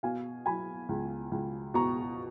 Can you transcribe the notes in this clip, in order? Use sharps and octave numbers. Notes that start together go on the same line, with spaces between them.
B2 F5 G#5
F#3 G#5 B5
C#2
C#2
B2 A#5 C#6